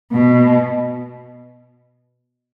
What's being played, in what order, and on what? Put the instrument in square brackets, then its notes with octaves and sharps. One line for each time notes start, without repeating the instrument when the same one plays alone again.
[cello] B2